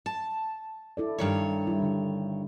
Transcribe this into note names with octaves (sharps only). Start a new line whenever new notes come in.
A5
E4 A4 D5
G2 D#3 C#5
G3 E4
D3 E4